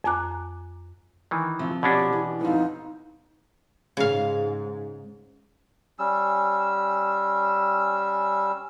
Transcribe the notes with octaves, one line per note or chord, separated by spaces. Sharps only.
F2 G#5 A#5 D6 F#6
D#3 E3
C3 F3
B2 C#4 D4 G4
E3
F2 B3 D#4
G#2 C#3 F5
G3 C#4 E6